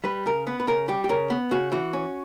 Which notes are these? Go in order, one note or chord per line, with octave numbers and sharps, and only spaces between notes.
G3 B4
C#3 A#4
B3 B4
B4
C#3 A#4
G3 G4
G4
C#3 A#4
B3
C#3 F#4
E3 F#4
C#4